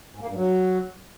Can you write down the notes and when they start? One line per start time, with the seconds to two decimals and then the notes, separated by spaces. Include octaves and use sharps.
0.15 G#2
0.22 A#3
0.29 G2
0.36 F#3